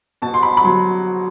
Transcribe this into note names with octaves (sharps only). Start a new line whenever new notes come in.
B2 A5
C6
B5
B5
F#3 C6